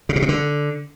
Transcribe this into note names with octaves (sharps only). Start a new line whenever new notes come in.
C#3
B2
C3
D3